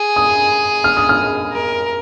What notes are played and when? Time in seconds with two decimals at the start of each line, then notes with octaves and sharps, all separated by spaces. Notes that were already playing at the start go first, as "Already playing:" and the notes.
Already playing: G#4
0.16 D#6
0.84 F6
0.97 D#6
1.09 F6
1.53 A#4